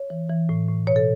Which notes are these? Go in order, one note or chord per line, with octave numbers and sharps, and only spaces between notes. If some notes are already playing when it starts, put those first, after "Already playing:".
Already playing: C#5
E3
E3
A2
A2
B2 C#5
A4